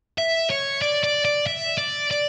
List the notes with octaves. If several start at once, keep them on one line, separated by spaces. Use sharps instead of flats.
E5
C#5
D5
D5
D5
E5
D5
D5